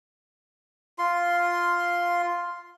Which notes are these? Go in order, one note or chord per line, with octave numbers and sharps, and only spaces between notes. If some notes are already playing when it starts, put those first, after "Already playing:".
F4 C6